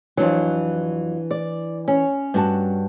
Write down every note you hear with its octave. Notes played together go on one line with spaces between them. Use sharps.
F2 E3 F#3 D4
D5
C#4
G2 F#4 A5